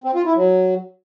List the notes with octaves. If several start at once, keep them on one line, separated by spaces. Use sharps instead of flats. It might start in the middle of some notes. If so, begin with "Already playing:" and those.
C4
F4
E4
F#3